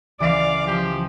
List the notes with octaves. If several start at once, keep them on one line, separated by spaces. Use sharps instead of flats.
C#2 E3 D5 F5 D6
F3 G4